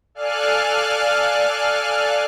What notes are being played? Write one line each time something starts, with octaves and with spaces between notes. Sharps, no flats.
A4 D5 F5 G#5 F6 F#6